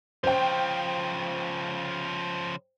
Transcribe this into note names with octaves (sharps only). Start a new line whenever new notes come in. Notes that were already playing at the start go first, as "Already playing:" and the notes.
C#3 F3 C5 G5